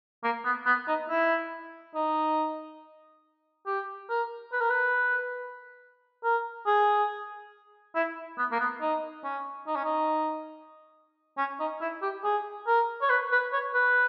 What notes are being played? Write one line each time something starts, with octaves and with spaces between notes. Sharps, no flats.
A#3
B3
B3
D#4
E4
D#4
G4
A#4
B4
A#4
B4
A#4
G#4
E4
B3
A#3
B3
D#4
C#4
D#4
C#4
D#4
C#4
D#4
E4
G4
G#4
A#4
C#5
B4
B4
C#5
B4